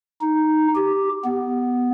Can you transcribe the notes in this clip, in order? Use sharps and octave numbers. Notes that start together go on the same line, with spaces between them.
D#4
G4
B3